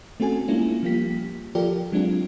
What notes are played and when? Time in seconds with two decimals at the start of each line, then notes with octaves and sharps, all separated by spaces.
0.20 A3 C4 C#4 F#4 A4 G#5
0.48 G#3 A#3 C#4 D4 E4 F4
0.83 F3 G3 A#3 F4 G4 B6
1.55 F3 F4 G4 A4 A#4 D5
1.92 F#3 G#3 C4 D4 F4